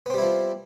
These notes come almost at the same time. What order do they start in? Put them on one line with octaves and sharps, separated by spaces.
B3 C4 G3 E4 F3